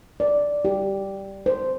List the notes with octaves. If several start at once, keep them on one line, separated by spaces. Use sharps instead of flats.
D5
G4
C5